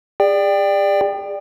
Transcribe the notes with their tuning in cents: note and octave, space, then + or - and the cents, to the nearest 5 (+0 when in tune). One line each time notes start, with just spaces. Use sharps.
G#4 -40 D5 +10 G5 +10